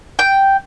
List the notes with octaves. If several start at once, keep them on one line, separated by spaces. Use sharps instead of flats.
G5